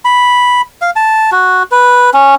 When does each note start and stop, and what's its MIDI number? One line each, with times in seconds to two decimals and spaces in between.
0.05 0.61 83
0.82 0.91 77
0.96 1.30 81
1.32 1.63 66
1.72 2.10 71
2.14 2.35 61